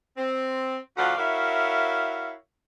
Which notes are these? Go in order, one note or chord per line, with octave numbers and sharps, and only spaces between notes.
C4
D2 F3 F#4 D5 F5 F#5
E4 F#4 A#4 C#5 E5 F5